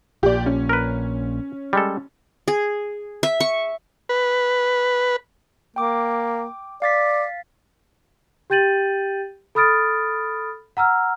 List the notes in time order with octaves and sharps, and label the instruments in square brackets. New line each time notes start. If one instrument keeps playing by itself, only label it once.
[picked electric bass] A#1 A#2 [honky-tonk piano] G4 D5
[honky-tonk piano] C#4
[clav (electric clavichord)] A#4 B4
G3 G#3 A4
[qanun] G#4
E5
C#6
[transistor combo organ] B4
[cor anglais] A#3 [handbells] G5 D6
[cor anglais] D5 [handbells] F5 A6 B6
[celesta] G4 G5 G6 A6 D#7 F#7
A4 B5 D#6 F6 A6 D7
F#5 A#5 E6 F6